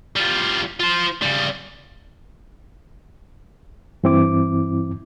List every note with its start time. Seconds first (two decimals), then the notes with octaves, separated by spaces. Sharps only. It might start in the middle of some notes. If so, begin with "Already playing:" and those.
0.16 G3 F4
0.80 F4 C5
1.22 C#3 G3
4.04 G2 E3 C4 E4 D6